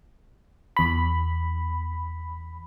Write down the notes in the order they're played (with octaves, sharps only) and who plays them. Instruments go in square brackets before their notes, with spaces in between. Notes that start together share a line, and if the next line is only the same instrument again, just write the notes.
[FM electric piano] E2 B5